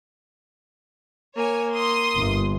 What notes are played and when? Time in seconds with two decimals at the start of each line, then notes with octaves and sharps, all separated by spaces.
1.36 A#3 C#5 G#5
1.74 C6 D#6
2.15 G1